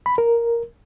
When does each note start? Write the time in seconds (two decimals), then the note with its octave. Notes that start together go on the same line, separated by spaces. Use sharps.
0.06 B5
0.18 A#4